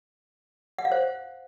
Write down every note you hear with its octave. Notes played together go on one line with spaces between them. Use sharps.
F#5
F5
C5